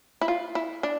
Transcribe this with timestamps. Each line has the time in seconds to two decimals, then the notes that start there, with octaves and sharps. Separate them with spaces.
0.21 E4
0.28 F4
0.55 E4
0.83 D4